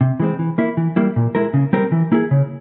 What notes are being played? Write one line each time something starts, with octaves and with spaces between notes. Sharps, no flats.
C3
E3 G#3 C4
E3
A#3 E4
E3
G3 A#3 E4
A#2
G#3 E4 A#4
C#3
G3 C4 G4 A#4
E3
A#3 E4 G#4
C#3